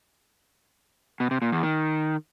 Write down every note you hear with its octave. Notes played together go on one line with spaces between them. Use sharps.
B2
C3
A#2
E2
D#3